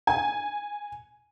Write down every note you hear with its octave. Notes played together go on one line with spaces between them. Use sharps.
G#5